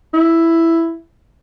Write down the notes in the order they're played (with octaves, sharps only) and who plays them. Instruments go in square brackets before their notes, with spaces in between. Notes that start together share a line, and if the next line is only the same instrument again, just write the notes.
[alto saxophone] E4